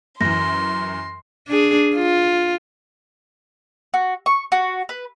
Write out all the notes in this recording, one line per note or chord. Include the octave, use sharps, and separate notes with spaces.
F#2 E3 C6 A#6
D4 G#4
F4
F#4
C#6
F#4
B4